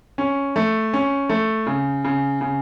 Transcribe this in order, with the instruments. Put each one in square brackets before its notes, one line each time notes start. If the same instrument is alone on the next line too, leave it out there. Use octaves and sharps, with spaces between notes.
[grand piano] C#4
A3
C#4
A3
C#3
C#3
C#3